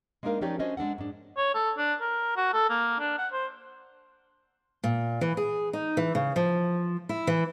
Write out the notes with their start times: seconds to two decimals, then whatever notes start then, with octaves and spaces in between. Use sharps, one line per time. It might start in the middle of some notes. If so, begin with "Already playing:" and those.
0.23 G#3 A#3 D4 D#4 A#4 F5
0.41 F3 C#4 D#4 G4 C#5 D5
0.59 C#4 D4 F#4 C5 C#5 D#5
0.77 G#3 D4 A4 F#5
0.98 G#2 D4
1.37 C#5
1.55 A4
1.77 D4
2.01 A#4
2.37 F#4
2.53 A4
2.70 A#3
3.00 D4
3.18 F#5
3.33 C5
4.84 A#2
5.21 E3
5.37 G#4
5.73 D#4
5.97 E3
6.15 C#3
6.36 F3
7.09 E4
7.27 E3